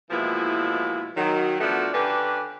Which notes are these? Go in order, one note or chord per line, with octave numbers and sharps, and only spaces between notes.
B2 E3 F3 G#3 A#3 E4
D#3 F#3
F3 A3 B3 D4 F#4
D3 C#4 D4 G4 B4